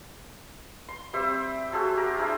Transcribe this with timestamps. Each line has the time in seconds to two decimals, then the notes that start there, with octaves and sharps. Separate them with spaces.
0.89 C6
1.13 G3 C4 C5 E5
1.72 F#4 G#4 A4 C5
1.97 G4 A#4
2.17 D4 E4 G#4 C5